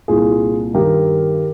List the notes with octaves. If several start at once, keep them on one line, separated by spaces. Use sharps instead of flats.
C2 A#2 F4 G#4
G2 D#3 G4 A#4